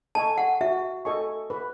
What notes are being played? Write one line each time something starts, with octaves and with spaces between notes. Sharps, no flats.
A4 D#5 G#5 A5 C#6
F#5
F#4 E5
A4 D#5 G#5 C#6
B4